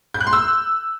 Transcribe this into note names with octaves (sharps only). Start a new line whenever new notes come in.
G6
F#6
C6
E6